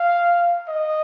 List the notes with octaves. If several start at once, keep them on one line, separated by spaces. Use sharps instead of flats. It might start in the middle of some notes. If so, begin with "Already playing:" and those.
Already playing: F5
D#5